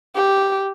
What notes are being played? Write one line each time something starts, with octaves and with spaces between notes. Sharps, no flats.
G4